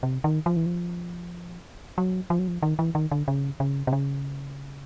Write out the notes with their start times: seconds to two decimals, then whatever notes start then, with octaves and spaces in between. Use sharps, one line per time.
0.03 C3
0.24 D#3
0.46 F3
0.56 E3
0.66 F3
1.98 F#3
2.30 F3
2.39 F#3
2.48 F3
2.63 D#3
2.79 E3
2.95 D#3
3.11 D3
3.28 C#3
3.60 C#3
3.87 C3
3.93 C#3